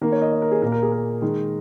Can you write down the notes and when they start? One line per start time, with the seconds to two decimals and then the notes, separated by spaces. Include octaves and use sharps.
0.01 D#3 A#3 A#4
0.12 C#5
0.22 D#5
0.32 D#5
0.42 A#4
0.52 G#4
0.62 A#2 A#4
0.66 A#3
0.72 A#4
0.82 G#4
0.92 A#4
1.22 D#3 G#3